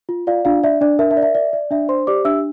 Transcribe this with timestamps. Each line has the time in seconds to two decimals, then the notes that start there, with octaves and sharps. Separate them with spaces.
0.09 F4
0.27 F4 D5 F5
0.45 D4 F4 F5
0.63 D5 E5
0.81 D4 D5
0.99 A#4 E5
1.11 E5
1.17 D5
1.22 E5
1.35 D5
1.53 D5
1.71 D4 E5
1.89 C5 C6
2.07 G4 D5 D6
2.25 D4 E5 E6